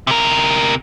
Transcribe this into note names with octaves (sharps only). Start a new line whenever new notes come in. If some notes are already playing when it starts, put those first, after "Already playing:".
C3 A#4